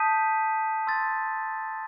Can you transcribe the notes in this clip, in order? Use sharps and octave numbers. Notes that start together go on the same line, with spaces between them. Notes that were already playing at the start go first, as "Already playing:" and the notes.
Already playing: A5 D#6 G6 B6 D#7
C6 E6 A6